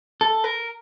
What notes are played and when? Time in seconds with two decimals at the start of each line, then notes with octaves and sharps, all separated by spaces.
0.21 A4
0.44 A#4